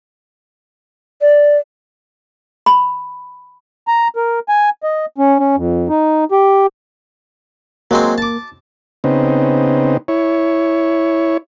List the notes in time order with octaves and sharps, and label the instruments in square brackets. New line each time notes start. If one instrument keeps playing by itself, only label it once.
[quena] D5
[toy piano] B5
[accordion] A#5
A#4
G#5
D#5
C#4
C#4
F2
D#4
G4
[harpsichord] F#3 G#3 C4 [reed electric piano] A#3
[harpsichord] A5 D6
[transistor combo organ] C#3 B3 C4 D#4
E4 C#5